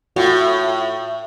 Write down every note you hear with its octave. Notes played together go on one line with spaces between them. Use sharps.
A2 F4 F#4